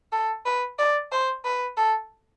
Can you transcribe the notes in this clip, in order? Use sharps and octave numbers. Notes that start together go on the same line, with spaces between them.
A4
B4
D5
C5
B4
A4